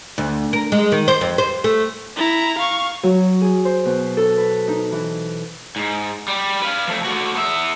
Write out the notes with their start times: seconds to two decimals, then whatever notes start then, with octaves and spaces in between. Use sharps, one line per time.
0.18 D2
0.53 A#4
0.72 G#3
0.92 D#3
1.08 C5
1.21 F2
1.38 C5
1.64 A3
2.16 E4 A#5
2.58 F5 C#6
3.03 F#3
3.41 G#4
3.65 C5
3.85 B2
4.17 A4
4.37 B4
4.68 D#4
4.92 E3
5.76 G#2
6.28 G3
6.62 B4 F5
6.88 F3 A3
7.05 A3 F#4
7.35 B3 E5